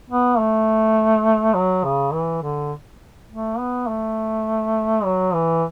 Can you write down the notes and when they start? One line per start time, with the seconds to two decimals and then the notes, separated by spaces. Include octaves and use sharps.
0.09 B3
0.38 A3
1.54 F#3
1.84 C#3
2.13 E3
2.42 D3
3.30 A3
3.59 B3
3.87 A3
5.04 F#3
5.33 E3